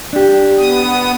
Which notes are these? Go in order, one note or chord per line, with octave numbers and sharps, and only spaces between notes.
D4 G4
B3 D#6